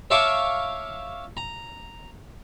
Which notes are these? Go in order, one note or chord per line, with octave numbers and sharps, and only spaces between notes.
C#5 E5 F5 A5 C#6 D6
A#5